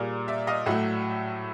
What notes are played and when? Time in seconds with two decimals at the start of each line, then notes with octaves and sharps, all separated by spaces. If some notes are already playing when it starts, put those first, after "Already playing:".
Already playing: A#2 G3 A#3 G#4 A#4
0.28 D5 E5
0.47 D#5 F5
0.66 A2 F#3 A3 E5 F#5